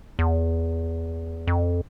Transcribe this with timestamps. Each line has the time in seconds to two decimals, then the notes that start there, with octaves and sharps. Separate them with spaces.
0.19 E2
1.47 F2